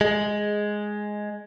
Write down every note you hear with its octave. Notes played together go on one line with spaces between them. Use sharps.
G#3